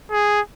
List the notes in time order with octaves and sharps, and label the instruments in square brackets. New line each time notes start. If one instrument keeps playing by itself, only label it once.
[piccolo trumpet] G#4